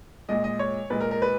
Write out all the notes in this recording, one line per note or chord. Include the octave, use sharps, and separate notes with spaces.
A#2 G#3 D#5
D#5
C#5
A#2 G#3 B4
A#4
A#4
B4